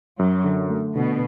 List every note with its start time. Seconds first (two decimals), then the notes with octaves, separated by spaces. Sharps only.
0.19 F#2 F#3
0.44 D3
0.70 A3
0.95 B2 D3